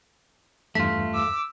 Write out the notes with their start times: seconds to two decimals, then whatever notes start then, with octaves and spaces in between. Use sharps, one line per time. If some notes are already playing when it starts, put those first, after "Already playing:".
0.75 E2 G2 A3 F4 B6
1.14 D6 E6